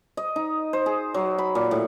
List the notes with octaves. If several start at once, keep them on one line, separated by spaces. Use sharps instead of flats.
D#5
D#4
C5
G#4
F#3
B5
A#2
A2